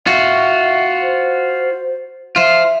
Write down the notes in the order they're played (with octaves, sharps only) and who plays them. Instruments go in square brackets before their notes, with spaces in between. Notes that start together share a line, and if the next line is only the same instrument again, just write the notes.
[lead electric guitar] F4 F#4 [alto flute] E5
[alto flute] C5
[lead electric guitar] F4 C5 [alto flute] E5